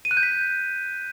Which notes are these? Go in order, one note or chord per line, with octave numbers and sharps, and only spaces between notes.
D#7
F#6
G6
B6